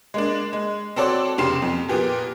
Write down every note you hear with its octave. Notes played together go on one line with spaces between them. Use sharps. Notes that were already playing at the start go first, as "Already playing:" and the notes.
G#3 A#3 D4
G#3
C4 F#4 A4 C#5 D5 C6
F1 C#3 G4 C6 C7 E7
F2
A#2 B3 G4 G#4